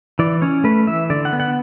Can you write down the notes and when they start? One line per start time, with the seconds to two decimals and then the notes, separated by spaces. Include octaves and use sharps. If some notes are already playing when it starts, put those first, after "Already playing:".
0.19 E3 D5
0.42 C#4 C#5
0.64 A3 B4
0.87 E3 E5
1.10 D3 D5
1.25 F#5
1.33 B3
1.40 F#5